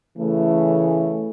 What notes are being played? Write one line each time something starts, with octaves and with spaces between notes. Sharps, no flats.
C#3 E3 A3